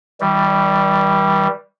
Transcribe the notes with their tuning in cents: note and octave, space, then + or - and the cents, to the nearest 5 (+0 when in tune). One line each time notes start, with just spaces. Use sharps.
E3 -45 G3 +0